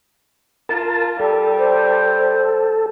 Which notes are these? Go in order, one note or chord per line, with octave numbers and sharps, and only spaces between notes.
F4 A#4 A5
G3 A4
C5